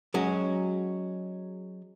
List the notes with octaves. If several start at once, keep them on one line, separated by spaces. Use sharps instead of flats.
F#3 G#3 C#4 F#4